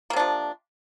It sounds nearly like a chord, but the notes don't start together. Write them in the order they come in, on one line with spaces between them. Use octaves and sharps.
A#3 C3 D4 F3